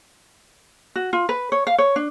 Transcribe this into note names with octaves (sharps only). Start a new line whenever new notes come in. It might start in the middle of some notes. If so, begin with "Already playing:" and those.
F#4
F4
B4
C#5
F5
C#5
D4